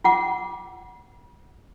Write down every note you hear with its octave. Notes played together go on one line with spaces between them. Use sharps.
F4 F#5 D6